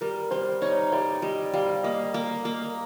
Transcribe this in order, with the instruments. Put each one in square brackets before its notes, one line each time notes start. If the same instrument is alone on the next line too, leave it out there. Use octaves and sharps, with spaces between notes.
[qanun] G3 [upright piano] A#4
[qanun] G3 [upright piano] C5
[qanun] D#4 [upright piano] C#5
[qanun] G3 [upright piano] D5
[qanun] G3 [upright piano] D#5
[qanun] G3 [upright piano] F5
[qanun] A#3 [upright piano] D#5
[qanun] A#3
A#3